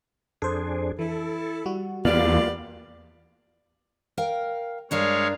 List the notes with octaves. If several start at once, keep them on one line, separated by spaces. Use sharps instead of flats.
F2 D4 G#4 A4 C5
E3 E4 A4
G3 F#4
E2 A#3 B3 F4 G4 D5 F5
A#4 F5 G5
G2 G#3 D4 A#4 C#5 F5